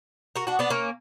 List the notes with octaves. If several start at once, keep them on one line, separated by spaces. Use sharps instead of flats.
F#4 A#4
D4 F#4
B3 D4
A#3 C#4